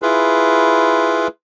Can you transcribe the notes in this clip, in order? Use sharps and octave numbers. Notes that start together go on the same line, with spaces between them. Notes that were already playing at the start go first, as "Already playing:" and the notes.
E4 F4 G#4 B4